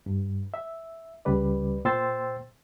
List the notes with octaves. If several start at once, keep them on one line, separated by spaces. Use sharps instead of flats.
G2
E5
C#2 C#3 G3 B4 D5
A#2 C5 G5 C6 E6 A6